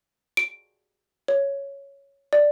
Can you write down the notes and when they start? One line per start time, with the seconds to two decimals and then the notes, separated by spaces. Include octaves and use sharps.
0.37 D7
1.28 C#5
2.33 D5